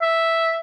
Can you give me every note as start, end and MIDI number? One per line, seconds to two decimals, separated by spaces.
0.02 0.60 76